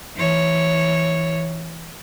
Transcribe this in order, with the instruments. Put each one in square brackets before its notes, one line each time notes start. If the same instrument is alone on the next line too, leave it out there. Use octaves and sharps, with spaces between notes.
[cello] E3 C#5